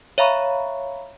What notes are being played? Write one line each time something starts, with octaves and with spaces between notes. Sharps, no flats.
C#5 E5 F5 A#5 B5 C#6